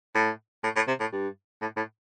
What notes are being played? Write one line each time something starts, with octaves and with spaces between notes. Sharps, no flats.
A2
A2
A2
C3
A2
G2
A2
A2